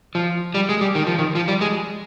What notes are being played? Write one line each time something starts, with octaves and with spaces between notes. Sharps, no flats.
F3
G3
G#3
G3
D#3
F3
D#3
F3
G3
G#3